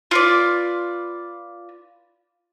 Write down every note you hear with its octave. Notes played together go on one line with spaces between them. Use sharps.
F4 B4 D5